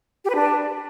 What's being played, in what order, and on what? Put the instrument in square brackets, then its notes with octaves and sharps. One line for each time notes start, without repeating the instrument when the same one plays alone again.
[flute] G4
B4
D4